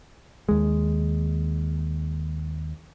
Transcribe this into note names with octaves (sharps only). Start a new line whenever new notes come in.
D#2 G#3